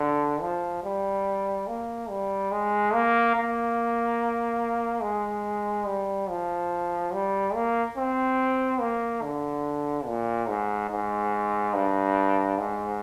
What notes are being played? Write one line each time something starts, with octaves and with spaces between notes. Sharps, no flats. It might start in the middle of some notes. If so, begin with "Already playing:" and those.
Already playing: D3
F3
G3
A#3
G3
G#3
A#3
A#3
G#3
G3
F3
G3
A#3
C4
A#3
D3
A#2
G#2
G#2
G2
G#2